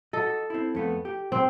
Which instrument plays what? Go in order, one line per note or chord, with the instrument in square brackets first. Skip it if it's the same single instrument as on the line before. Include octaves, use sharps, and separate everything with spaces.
[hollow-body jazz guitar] F#4 D#5 [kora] A4
[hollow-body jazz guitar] C4 E4
F2 A3 B3
G4
[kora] C4